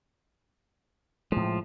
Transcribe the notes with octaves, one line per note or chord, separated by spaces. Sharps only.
A2 F3 G#3